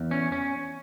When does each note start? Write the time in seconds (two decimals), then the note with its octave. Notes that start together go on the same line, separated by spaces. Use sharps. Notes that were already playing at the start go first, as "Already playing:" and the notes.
Already playing: E2
0.11 C#4
0.32 C#4